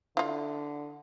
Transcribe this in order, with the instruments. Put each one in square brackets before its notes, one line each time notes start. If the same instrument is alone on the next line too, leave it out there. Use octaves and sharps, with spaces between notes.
[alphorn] D3 [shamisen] E4 F4